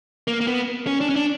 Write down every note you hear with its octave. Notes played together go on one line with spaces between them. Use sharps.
A#3
A#3
B3
C#4
D4
C#4
D4